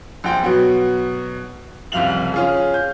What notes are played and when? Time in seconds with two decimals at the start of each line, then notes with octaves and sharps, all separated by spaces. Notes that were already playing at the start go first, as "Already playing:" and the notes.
0.24 A#1 G5 C6
0.43 B2 F#3 B3
1.92 F#1 C2 F2 F5 F7 F#7
2.34 C#4 F4 G#4
2.74 G6